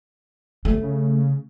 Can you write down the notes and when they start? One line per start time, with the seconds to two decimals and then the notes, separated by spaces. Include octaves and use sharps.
0.65 G1 A3
0.83 C#3